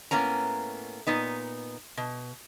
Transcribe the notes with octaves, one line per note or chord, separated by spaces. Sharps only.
A2 A#3 B3 C#4 A#5
A#2 B3 D#4
B2